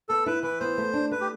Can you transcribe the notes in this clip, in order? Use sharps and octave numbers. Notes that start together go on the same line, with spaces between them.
B3 A4
E4 B4
E3 B4
B3 C5
A3
D4
A3 B4
G4